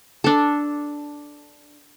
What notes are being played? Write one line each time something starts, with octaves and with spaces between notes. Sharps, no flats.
D4 A4